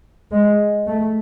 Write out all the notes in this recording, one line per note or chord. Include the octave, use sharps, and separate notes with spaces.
G#3
A3